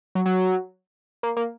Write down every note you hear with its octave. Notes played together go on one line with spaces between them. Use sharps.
F#3
F#3
A#3
A#3